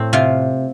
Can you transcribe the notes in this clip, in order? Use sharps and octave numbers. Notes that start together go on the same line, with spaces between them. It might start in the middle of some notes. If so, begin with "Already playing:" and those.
Already playing: A2 C4
C3 F4